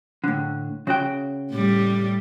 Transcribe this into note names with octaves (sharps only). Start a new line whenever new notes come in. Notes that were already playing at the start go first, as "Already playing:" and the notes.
A2 D3
C#3 F#4 G5
A2 G3